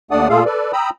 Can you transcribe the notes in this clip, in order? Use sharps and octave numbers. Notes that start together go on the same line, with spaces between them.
D#2 A3 D4 D5 F#5 D#6
A#2 A3 F4 G#4 A4 F5
A4 B4 D5
G5 A#5 B5 D#6 E6